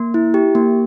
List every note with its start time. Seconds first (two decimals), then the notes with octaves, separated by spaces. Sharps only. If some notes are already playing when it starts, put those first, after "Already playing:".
Already playing: A#3
0.14 E4
0.34 G4
0.55 A#3